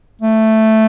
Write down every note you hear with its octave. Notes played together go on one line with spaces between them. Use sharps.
A3